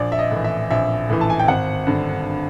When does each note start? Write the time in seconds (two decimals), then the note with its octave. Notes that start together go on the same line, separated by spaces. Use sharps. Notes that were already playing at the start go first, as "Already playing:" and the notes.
Already playing: A#1 D5
0.12 E5
0.19 D#5
0.31 A2 E3
0.44 E5
0.70 A#1 E5
1.10 A2 E3
1.21 A5
1.30 G#5
1.39 G5
1.48 G#1 F#5
1.87 G2 D3